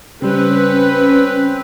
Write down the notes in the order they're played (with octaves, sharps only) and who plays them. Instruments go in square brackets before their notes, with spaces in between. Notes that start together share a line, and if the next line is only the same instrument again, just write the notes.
[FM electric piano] C#3 G3 [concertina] C4 [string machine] C#4 [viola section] B4